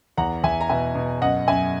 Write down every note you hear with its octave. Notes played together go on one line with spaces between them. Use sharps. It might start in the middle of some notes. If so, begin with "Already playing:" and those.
E2 F#5 A#5
E2 E5 G#5
A#5
B2 E5 G#5
B2
F#2 D#5 F#5
F#2 E5 G#5